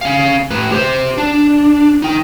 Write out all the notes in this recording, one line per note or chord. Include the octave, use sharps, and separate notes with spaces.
C#4 F5
A2 B4
G4 C5
D4
D#4 G5